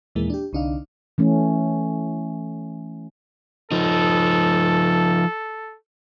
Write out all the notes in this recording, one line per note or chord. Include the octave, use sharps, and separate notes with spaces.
D#2 A#2 E3 G#3 A#3
D4 G4
C2 D3 D4 D#4 F5
E3 A3 C#4
F3 D#4 A4